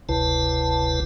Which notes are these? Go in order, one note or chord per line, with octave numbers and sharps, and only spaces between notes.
F#1 D2 C3 E4 B4 A5